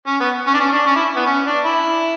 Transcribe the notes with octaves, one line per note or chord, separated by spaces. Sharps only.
C#4
B3
C#4
D4
C#4
D4
C#4
E4
B3
C#4
D4
E4